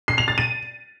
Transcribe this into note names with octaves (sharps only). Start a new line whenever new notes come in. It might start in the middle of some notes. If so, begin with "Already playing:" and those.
C7
F7
A6
D#7